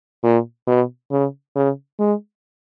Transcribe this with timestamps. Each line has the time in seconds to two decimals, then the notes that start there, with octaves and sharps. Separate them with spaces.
0.24 A#2
0.67 B2
1.11 C#3
1.56 C#3
2.00 G#3